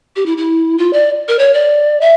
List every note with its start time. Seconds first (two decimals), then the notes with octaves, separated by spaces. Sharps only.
0.16 G4
0.26 E4
0.37 E4
0.78 F4
0.93 D5
1.28 A#4
1.39 C#5
1.54 D5
2.01 E5